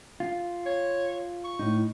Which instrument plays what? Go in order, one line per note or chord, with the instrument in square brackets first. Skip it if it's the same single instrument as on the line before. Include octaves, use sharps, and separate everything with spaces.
[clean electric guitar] F4
[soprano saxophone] C#5
C#6
[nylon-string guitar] A2 D#4